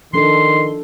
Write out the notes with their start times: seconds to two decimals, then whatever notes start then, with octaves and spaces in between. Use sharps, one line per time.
0.13 D#3 F3 D4 A4 C6